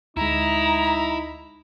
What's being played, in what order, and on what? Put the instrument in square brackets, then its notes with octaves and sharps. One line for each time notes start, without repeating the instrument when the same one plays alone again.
[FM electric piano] D2 G#3 [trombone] D#4 [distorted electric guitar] E4 [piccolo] A#5